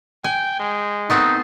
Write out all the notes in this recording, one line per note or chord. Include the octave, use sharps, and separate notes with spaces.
G5 G#5
G#3
A3 B3 C4 D#4